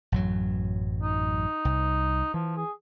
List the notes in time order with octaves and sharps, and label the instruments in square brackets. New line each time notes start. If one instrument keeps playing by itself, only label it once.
[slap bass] A1 F#2 F#3
[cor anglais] D#4
[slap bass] C2
[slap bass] E3 [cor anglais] F3
[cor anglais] G#4